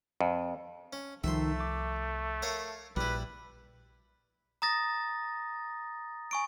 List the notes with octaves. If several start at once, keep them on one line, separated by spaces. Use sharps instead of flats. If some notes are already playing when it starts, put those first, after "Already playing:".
F2
C#4
C2 D#3 F3 A3 E5 C6
D6
A#4 C#5 F5
A#1 G3 E4 B4
A#5 D#6 A6 A#6
G#5 C#6 D7